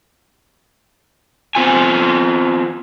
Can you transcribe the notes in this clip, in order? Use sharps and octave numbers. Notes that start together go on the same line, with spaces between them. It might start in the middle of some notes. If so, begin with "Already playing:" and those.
B3 C4 F4 G#5